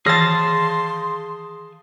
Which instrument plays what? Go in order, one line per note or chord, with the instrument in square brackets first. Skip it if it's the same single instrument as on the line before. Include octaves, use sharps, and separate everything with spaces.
[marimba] D#3 E3 [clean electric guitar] G#4 F5 A5 [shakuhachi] C6 [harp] A6 A#6